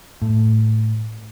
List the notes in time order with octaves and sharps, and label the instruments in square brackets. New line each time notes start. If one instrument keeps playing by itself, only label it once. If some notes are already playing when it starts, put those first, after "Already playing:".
[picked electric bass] A2